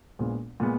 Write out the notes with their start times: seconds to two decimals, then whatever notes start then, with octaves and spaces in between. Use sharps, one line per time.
0.19 A#1 A#2 G#3 B3
0.60 A#2 G#3 B3